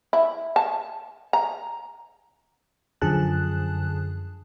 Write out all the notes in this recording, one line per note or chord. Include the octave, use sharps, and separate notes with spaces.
E4
A5
A#5
F#2 D3 F3 G#4 A5 F#6